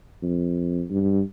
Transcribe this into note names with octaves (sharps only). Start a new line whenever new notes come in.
F2
G2